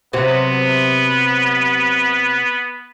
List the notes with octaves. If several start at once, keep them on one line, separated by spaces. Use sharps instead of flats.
C3 F#3 B3